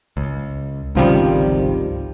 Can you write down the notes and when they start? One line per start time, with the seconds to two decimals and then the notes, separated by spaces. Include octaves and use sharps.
0.17 C#2
0.95 G#1 C#2 C3 D#3 F3 G3